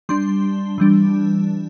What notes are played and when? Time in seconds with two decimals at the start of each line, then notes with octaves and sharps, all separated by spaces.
0.09 G3 D4 C6
0.78 E3 G3 D4